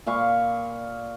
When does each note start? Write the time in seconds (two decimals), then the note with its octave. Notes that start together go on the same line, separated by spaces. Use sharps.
0.07 A#2 F5 B5 C#6